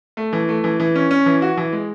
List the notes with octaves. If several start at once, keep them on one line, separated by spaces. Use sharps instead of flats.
A3
E3
A3
E3
E3
C#4
C#4
E3
F#4
E3
G#3